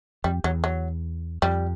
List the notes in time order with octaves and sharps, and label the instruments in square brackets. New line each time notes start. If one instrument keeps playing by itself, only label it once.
[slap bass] F2 [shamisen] G3
[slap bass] E2 [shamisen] F#3
[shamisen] F#3
[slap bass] F2 [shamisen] G3